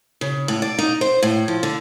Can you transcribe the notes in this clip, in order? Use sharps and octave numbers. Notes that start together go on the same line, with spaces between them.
C#3
A2
D5
D#4
C5
A2
F3
D3